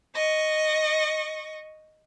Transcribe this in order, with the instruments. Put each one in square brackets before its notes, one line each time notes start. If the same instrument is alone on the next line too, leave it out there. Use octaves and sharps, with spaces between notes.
[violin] D#5 C#6